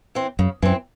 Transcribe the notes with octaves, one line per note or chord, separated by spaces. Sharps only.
E3 C4
F#2 C#3
F#2 E3 C4